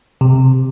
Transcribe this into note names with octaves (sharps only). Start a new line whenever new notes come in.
C3